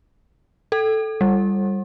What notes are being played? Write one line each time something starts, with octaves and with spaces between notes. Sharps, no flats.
A4
G3